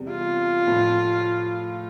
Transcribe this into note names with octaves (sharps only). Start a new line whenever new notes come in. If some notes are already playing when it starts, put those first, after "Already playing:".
Already playing: E2 C3 G3
F4
A2 F3 A3